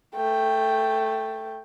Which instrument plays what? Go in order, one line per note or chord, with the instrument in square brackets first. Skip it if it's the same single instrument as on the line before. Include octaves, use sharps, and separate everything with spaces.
[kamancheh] A3 G5